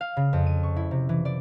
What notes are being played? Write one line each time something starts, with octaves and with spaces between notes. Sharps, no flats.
F5
C#3
F2
D#7
C#6
E4
C3
E3
D5